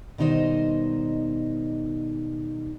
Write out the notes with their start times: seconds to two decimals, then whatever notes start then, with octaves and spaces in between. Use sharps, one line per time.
0.18 B2 D#3 G3 D#4 C5 D#5